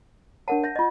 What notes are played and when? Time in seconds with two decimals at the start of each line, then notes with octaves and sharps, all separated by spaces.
0.48 D4 A#4 C#5 F#5 A5
0.64 E5 G6 A#6
0.76 F4 D#5